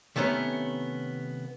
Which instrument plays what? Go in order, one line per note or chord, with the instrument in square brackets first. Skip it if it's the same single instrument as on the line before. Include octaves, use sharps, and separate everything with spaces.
[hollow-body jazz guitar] C3 D#3 A3 B3 C#4